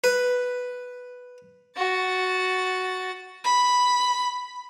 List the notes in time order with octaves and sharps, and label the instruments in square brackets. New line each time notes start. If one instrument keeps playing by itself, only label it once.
[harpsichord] B4
[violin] F#4 A6
B5